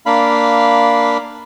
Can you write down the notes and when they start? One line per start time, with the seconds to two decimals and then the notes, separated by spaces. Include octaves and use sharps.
0.06 A#3 D4 F5 B5